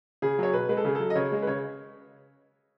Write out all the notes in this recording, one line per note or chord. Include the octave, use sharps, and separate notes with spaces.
C#3 G#4
F#3 C#5
B2 B4
G#3 B4
A4
C#3 G#4
F#3 A4
D#5
C#3 C#5
G#3
B4
C#3 C#5